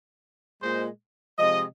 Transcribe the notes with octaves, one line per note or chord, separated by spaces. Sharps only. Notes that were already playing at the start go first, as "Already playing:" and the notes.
A#2 G#3 C5
C3 F3 G#3 D#5